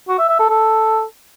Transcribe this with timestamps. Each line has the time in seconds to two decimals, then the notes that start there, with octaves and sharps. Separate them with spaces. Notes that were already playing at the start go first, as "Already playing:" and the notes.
0.09 F#4
0.19 E5
0.29 E5
0.40 A4
0.50 A4